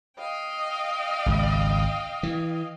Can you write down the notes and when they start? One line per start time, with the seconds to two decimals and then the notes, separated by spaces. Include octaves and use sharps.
0.18 D#5 F5 G5
1.26 G#1 C#2
2.23 E3